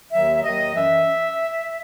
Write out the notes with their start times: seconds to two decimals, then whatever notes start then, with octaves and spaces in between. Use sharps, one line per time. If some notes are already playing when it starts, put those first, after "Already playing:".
0.12 D#2 D#3 F#3 E5
0.43 D#2 D#3 F#3 D#5
0.74 F#2 E3 E5